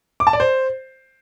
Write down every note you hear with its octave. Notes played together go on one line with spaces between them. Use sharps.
D6
A5
D5
C5